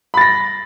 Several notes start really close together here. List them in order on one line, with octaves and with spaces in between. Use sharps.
B5 A6 A#6